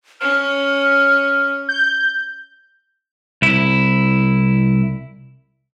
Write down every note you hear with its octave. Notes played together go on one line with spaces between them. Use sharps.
C#4 F6
G6
C2 E4